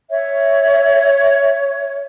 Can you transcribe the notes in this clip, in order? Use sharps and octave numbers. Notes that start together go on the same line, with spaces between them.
C#5 E5